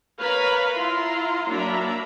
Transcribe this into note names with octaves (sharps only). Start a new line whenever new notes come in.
A#4 B4 C#5 F5 A#5 B5
E4 F4 A#5 C6
F#3 A#3 D4 E5 A#5 B5